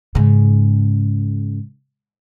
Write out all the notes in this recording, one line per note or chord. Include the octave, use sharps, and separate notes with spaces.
G#2 C#3